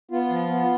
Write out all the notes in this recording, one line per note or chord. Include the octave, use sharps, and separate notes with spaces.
B3 F4
F3
B3